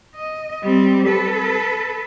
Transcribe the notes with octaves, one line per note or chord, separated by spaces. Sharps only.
D#5
G3 C4
A4 B4